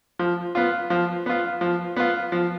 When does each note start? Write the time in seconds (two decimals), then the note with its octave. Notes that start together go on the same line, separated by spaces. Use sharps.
0.19 F3
0.55 B3 F4
0.90 F3
1.26 B3 F4
1.61 F3
1.96 B3 F4
2.32 F3